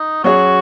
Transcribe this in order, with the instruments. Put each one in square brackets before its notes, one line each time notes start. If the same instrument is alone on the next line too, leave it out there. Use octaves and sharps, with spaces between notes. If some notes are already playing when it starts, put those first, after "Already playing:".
Already playing: [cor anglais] D#4
[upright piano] F#3 C#4 G#4 C#5 [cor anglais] F#4